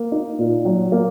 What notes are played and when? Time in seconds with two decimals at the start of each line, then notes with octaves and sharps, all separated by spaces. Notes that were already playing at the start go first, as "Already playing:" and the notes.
Already playing: A#3
0.12 D#4
0.39 A#2
0.65 F#3
0.92 A#3